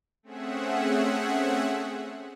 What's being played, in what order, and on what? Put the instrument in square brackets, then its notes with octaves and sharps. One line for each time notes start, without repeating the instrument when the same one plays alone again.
[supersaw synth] A3 C4 C#4 G#4 E5 F#5